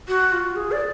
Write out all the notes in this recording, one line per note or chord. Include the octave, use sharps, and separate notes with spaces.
F#4
F4
G#4
D5